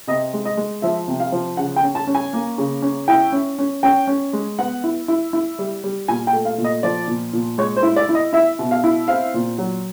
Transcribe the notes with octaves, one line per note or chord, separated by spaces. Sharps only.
C3 D#5
G#3
D#5
G#3
F3 E5
C3
F5
F3
C#3 F#5
G5
C#4
A5
C#4
G#5
A#3
C#3
C#4
E4 G5
C#4
C#4
C#4 G5
C#4
G#3
B3 F#5
E4
E4
E4
G3
G3
A#2 G#5
G5
A3
F5
A#2
D#5
F3 D5
A#2
A#2
G#3 C#5
C5
E4
D5
E4
D#5
E4 E5
B2
F5
E4
C4 F5
A#2
F#3